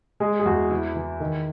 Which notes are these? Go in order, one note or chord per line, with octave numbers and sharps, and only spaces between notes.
G#3 G#4
G#4
E2 F#4
E3 E4
E3
D#3